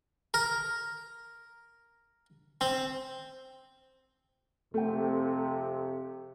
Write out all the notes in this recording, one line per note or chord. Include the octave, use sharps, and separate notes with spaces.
A#4
C4
F2 C3 A3 G5